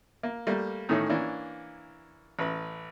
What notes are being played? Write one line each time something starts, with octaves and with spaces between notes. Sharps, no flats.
A#3
G3 A3 A#3
A2 D#3 E3 A3 C#4 D#4
E3 A#3 C#4 D4
A1 B4 B5